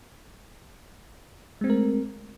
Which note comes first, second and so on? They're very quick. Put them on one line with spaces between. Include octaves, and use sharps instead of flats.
G#3 C4 A3 A#4